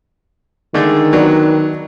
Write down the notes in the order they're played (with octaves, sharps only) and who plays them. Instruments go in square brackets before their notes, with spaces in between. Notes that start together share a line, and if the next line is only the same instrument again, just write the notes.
[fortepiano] D3 G#3 A3 [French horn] D#3
[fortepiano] F#3 B3 D4